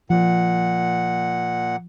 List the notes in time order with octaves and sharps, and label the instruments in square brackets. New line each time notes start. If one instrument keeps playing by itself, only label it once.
[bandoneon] A#2 F#5 [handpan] F3